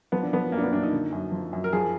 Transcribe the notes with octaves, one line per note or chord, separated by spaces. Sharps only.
F3 B3
D4
F3 B3
F#2 A#3
D4
B3
F#2 D4
D#4
D3
F#2
F3
F#2
A#4
F3 G#4